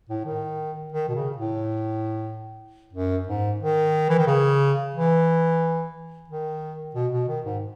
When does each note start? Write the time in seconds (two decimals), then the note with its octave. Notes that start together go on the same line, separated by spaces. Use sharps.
0.09 A2
0.25 D#3
0.93 D#3
1.09 B2
1.15 C#3
1.37 A2
2.93 F#2
3.27 G#2
3.60 D#3
4.10 E3
4.18 D#3
4.27 C#3
4.94 E3
6.28 D#3
6.95 B2
7.12 B2
7.28 D#3
7.45 G#2